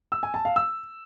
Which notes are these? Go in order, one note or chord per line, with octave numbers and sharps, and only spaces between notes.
E6
G#5
A5
F5
E6